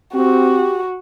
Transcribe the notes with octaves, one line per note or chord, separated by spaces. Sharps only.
C4 F#4 G4